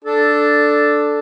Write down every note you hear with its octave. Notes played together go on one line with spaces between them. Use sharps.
D4 A4